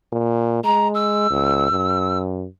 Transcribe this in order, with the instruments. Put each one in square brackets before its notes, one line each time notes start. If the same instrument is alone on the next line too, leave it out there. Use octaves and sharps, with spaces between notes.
[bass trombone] A#2
[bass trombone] G#3 [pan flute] A#5
[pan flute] E6
[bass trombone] C#2
F#2